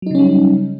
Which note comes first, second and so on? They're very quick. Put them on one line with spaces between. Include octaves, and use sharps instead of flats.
F#3 D#4 C#3 C#4 G3